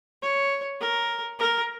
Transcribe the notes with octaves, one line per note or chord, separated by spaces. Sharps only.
C#5
A#4
A#4